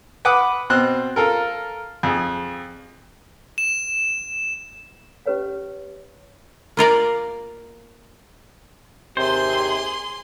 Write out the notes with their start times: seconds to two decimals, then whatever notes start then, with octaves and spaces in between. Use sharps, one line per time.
0.25 B4 F#5 B5 D6 D#6
0.70 B2 C4 C5 F#6
1.16 F4 A4 A#4
2.03 F2 G#4
3.58 E7
5.26 C#4 G4 B4 C#5 F5
6.77 A#3 F4 A#4 D5
9.17 D#2 C3 G#4 C5 C6